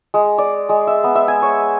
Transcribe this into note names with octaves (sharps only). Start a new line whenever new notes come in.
G#3
D5
G#3
E5
B3
E5
G#5
C#5